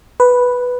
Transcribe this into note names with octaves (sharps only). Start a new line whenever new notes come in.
B4